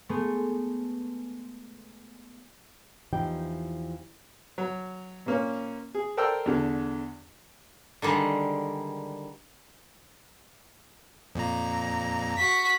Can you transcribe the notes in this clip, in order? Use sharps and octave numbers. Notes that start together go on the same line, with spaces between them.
G#3 A3 B3
E2 E3 F3 D#4 G4 G5
F#3
A#2 A#3 C#4
G#4
A4 A#4 C5 D5 G5 E6
E2 D3
D3 D#3 G3 G#3
F2 A#2 A#5
F#4 B6